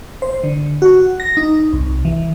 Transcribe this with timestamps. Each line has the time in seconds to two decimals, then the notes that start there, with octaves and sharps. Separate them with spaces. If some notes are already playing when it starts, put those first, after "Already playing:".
0.22 C5
0.44 D3
0.82 F#4
1.20 A#6
1.37 D#4
1.73 C2
2.05 E3